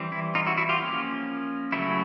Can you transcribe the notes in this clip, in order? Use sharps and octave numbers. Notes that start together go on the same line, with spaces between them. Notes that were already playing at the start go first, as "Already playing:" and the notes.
Already playing: E3 G3 C4
E4
D#4 F4
E4 F#4
E4 F#4
F4 G4
F3 A#3 C#4
C#3 F#3 A3 C#4 E4 F#4